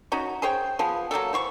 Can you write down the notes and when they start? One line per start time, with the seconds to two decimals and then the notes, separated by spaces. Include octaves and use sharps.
0.12 C#4 D#4 F#4
0.42 G#4 C5 C#5 G5
0.79 F3 B3 G#4
1.11 F#3 G3 A#3 A4
1.33 E3 C5 C#6